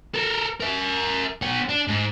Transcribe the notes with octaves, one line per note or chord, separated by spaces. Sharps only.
A4 A#4
A#4 E5
B3 C#5
D4
G#2